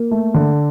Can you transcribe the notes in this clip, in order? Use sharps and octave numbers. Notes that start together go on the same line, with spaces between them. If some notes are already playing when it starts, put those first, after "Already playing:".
Already playing: A#3
A3
D3